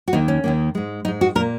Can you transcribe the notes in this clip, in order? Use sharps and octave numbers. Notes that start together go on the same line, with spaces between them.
F#4
D#2 D#3 A#3 D#4
C#4
D#2 D#3 A#3
G#2 G#3
G#2 G#3 D#4
F#4
A#2 A#3 A#4